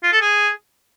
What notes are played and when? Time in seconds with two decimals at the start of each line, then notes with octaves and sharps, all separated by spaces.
0.03 F4
0.12 A4
0.21 G#4